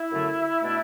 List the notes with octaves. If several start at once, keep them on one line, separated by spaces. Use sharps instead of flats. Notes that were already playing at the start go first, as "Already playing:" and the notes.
Already playing: E4
F#2 D3 F#3 A3
B2 A3 D4